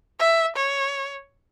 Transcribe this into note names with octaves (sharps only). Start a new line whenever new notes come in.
E5
C#5